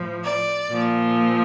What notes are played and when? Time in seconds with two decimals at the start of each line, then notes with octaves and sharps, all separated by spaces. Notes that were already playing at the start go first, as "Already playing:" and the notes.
Already playing: A2 F3
0.24 D5
0.69 A#2 F3